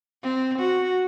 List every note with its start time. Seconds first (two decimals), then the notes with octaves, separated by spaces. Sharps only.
0.23 C4
0.59 F#4